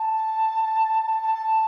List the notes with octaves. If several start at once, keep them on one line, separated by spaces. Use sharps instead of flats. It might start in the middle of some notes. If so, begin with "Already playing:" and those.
Already playing: A5
A5
A5
A5